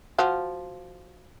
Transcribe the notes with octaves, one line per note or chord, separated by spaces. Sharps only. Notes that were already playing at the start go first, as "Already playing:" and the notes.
F3 F#4 F5